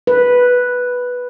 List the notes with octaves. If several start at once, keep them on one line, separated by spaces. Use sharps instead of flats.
B4